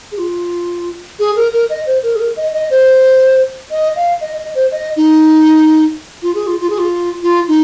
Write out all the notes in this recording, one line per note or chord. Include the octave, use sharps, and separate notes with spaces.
G#4
F4
G#4
A#4
A#4
D#5
C5
A#4
G#4
A#4
D#5
D#5
C5
D#5
F5
D#5
D#5
C5
D#5
D#4
F4
G#4
F4
F4
G#4
F4
F4
D#4